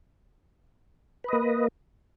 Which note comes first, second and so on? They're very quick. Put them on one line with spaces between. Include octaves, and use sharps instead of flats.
B4 D#5 A#3